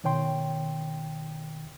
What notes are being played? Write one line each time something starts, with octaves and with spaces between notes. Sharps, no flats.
B2 D#3 C#5 G5 C6